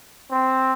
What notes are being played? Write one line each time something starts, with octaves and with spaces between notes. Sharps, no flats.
C4